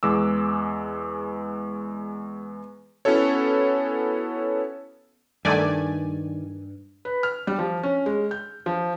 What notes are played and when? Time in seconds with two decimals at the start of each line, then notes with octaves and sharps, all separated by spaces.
0.03 E2 G#3 D6 E6
3.05 B3 C#4 E4 F#4 A4 C#5
5.45 G2 D#3 A3 D5 G#5
7.05 B4
7.23 F6
7.47 G3
7.59 F3
7.83 C#4
8.06 G#3
8.31 G6
8.66 F3